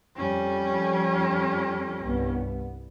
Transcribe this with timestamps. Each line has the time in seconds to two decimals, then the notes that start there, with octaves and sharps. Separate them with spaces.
0.17 F2 F3 G3 C#4
2.03 C2 G2 B3